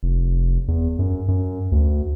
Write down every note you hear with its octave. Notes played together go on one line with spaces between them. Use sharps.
F1
E2
F#2
F#2
D2